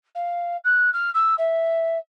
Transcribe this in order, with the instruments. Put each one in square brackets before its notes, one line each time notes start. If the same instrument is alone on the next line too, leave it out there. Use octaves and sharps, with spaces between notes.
[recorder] F5
F#6
F6
E6
E5